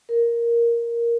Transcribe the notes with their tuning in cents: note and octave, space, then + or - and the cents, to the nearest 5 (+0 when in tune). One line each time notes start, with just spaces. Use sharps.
A#4 +5